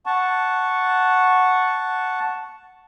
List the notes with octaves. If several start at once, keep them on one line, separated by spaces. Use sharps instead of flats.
F#5 A5 C#6